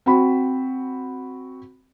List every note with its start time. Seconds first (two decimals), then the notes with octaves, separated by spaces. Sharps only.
0.06 C4 F#4 B5